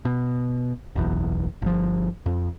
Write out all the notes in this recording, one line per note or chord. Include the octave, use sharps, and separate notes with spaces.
B2
F#1 B1 E2
G1 F3
F2